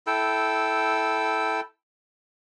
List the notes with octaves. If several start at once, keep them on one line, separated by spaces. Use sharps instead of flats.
E4 A4 G5 E6